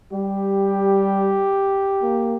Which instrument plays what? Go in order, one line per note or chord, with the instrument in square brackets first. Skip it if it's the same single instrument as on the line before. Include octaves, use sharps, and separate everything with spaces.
[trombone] G3 [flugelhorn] G4
[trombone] A#3